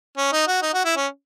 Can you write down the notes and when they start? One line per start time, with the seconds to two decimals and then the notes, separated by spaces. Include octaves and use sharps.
0.17 C#4
0.32 D#4
0.47 F#4
0.62 D#4
0.74 F#4
0.85 E4
0.96 C#4